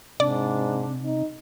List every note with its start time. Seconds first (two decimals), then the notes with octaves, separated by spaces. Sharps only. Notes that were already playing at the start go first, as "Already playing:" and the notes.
0.20 G#2 C3 D4 D5
1.03 D#4